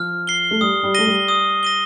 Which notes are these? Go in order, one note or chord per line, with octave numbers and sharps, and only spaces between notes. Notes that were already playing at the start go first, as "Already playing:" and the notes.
Already playing: F3 F6
C7 G7
A3
G3 D#6
G3
A3 A#6 D#7 G7
G3
D#6
A#6 D#7 G7